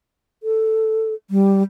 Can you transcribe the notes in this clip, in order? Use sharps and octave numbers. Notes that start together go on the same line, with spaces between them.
A4
G3